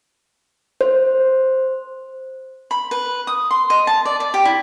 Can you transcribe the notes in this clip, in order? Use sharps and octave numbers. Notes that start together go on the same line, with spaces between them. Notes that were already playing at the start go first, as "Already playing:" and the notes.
C5
B5
B4
D#6
C6
D#5
A5
D5
D5
G4
E4